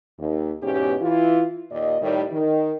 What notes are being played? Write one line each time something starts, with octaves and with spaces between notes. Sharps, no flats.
D#2
E2 G#2 B2 C#4 G4
E3 E4 F4
D#2 A#2 D5 D#5
A2 D#3 G3
D#3